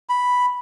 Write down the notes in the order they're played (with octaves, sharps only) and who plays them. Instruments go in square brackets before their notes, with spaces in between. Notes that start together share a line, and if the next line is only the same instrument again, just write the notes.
[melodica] B5